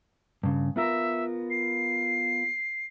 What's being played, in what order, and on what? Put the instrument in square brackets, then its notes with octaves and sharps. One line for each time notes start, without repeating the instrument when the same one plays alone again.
[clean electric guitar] G2 C#3
[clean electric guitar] B3 F4 A#4 [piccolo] E5
[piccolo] C7